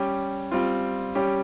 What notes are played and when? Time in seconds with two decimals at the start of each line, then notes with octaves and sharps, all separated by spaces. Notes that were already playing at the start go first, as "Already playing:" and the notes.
Already playing: G3 C#4 G4
0.52 G3 C4 F4
1.15 G3 C#4 G4